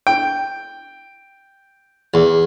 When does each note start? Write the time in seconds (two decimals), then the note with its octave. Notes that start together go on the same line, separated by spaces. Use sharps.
0.07 G5
2.14 E2